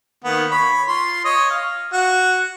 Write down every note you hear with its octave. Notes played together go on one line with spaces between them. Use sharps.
D#3 A#3 B3
C#5 B5
F4 C6
C#5 D#5
F5
F#4